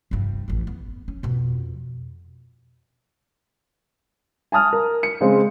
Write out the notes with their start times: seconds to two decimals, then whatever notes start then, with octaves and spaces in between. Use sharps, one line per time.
0.11 F1 G2
0.48 A1 F2
0.67 B3
1.08 C#4
1.23 F2 B2
4.52 G#5 A5 D#6 F6
4.73 A#4
5.03 C#7
5.21 C#3 G#3 C4